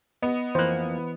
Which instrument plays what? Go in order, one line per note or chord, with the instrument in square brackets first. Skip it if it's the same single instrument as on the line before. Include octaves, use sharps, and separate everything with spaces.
[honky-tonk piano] B3 [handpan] D#5
[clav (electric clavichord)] F2 A#3 [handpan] E3 [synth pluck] C5 F#6